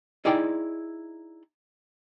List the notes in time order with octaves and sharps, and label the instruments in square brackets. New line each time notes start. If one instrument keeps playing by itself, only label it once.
[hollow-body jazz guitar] D#4 E4 G#4 D5 G5